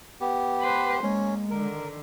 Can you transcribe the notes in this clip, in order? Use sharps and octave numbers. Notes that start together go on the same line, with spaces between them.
B3 G4
B4 C5
G#3 A#3 C#4
D3 D#3 A#4